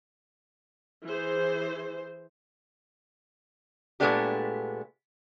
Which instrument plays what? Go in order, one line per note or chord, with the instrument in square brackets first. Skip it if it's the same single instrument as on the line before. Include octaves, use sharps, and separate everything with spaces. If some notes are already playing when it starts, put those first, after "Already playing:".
[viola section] E3 G#4 C5
[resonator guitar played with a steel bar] A#2 G#3 A3 B3 D4 G4